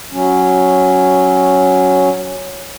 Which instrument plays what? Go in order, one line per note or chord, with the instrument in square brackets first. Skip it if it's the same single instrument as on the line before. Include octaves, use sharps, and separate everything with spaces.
[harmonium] F#3 C#4